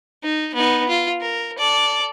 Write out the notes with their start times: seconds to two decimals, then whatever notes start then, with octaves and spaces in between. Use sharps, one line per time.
0.23 D#4
0.55 B3 D#4
0.88 F4
1.21 A#4
1.58 A4 D5